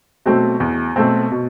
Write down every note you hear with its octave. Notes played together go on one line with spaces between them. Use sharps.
B2 F#3 A3 C4
E2
B2 F#3 A3 C4
B2